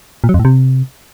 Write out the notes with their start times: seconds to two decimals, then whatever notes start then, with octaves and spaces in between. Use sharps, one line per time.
0.24 A#2
0.29 F#3
0.34 F2
0.39 A2
0.45 C3